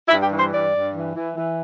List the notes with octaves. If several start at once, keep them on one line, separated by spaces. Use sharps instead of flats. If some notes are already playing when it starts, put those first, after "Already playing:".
E4
G2
G4
E3
C5
G2 D5
G2
E3
E3
E3